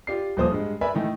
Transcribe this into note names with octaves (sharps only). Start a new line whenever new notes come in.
F4 G4 D5 C7
D#1 F3 A#3 C5 A5 D#6
G2 G#3
A#4 B4 D5 E5 G#5 B5
D#3 A3 E4